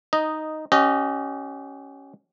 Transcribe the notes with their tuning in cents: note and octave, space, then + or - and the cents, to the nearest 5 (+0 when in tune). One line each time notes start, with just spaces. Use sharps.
D#4 +0 D#5 -5
C#4 +0 G4 -35 D#5 -10